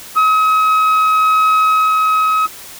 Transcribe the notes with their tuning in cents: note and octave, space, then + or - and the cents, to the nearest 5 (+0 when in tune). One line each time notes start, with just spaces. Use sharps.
D#6 +40